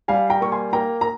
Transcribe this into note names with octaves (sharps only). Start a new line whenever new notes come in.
G3 F5 G#5
G5 A#5
A#3 C#6
G#5 C6
A#3 G5 A#5
A#5